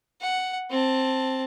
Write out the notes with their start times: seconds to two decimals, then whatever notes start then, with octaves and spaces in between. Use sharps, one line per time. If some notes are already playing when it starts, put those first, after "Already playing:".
0.22 F#5
0.70 C4 A5